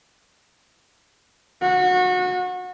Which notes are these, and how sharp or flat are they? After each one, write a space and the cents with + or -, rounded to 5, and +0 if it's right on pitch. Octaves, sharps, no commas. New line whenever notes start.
F#4 -25